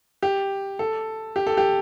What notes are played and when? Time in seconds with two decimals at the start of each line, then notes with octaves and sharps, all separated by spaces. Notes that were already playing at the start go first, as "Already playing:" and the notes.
0.22 G4
0.79 A4
1.36 G4
1.47 A4
1.57 G4